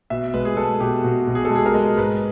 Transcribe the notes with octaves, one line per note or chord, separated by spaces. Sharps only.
B2 E5
G#3 B4
G#4
G#3 A4
B2 G4
B2 F#4
B2
G#4
A4
G#3 G#4
A#4
G#3
G#2 B4